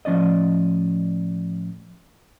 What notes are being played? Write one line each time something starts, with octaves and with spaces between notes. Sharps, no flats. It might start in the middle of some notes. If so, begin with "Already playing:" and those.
A2 F3 C#4 D5 D#5